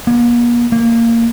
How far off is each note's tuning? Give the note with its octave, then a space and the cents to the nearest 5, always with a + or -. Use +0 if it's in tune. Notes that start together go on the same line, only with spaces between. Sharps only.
A#3 +45
A#3 -15